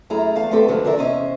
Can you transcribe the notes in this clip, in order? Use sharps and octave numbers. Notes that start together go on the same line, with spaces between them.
F#2 A3 E4 G#4 A#5
E2 F5 A5
A3 B3 C4 G4 A4
G#2 D3 F3 F#3 C4
E2 D3 F3 A#4 D5 E5
E2 C3 C#4 C5 D#5 E5